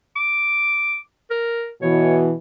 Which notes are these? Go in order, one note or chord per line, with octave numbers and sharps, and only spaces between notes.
D6
A#4
B2 E3 C#5